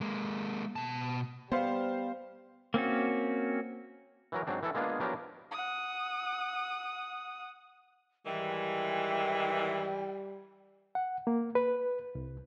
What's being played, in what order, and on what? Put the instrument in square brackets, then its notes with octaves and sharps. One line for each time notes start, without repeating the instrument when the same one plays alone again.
[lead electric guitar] G#3 A#3
B2 A5
[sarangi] G3 [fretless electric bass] B3 [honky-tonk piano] C5 F5
[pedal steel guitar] A#3 C4 C#4 F#4
[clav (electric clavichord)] E3 F#3 A#4
G#2 F#3 C4 D4
E3 E4 A4
G#3 A#3 B3 D4 F4 G#4
F3 F#3 B3 D4 G4 A#4
[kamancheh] F#5 D#6
[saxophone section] G#2 D#3 E3 [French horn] G3 [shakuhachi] G5
[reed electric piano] F#5
A#3
B4
C2